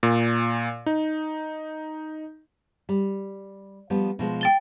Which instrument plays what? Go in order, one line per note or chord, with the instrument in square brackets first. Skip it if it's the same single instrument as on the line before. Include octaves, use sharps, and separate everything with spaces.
[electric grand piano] A#2
D#4
[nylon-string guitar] G3
F3 G3 B3
B2 F3 G#3
[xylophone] G5 A6 G7